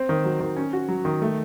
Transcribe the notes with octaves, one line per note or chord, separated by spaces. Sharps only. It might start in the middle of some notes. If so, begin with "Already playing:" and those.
Already playing: C4
D#3
F#3
D#3
C#4
F#4
F#3
D#3
A3